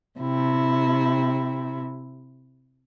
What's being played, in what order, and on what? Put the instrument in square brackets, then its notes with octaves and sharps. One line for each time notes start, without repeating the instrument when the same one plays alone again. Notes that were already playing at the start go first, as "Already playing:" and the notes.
[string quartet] C3 E4